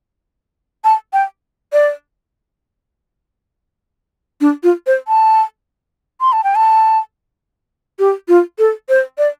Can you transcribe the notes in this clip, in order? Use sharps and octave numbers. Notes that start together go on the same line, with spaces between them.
A5
G5
D5
D4
F4
C5
A5
C6
A5
G5
A5
G4
F4
A4
C5
D5